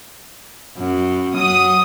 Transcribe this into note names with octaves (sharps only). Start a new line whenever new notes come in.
F#2
F#3 D#6